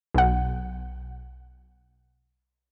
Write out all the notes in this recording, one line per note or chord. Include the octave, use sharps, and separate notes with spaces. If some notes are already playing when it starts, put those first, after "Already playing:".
B1 F#5